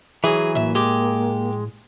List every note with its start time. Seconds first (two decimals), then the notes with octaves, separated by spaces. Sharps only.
0.24 E3 F#3 G#4
0.55 A2 A#3 E5
0.75 G#3 G4